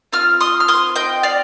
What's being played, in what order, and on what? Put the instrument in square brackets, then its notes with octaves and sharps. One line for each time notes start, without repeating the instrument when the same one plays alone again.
[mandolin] C4 F4 F6
C6 D#6
F6
C6 D#6
D#5 G5
D5 F5